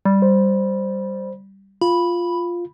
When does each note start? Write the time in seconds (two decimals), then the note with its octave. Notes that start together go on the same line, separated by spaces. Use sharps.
0.05 G3
0.22 C5
1.81 F4 B5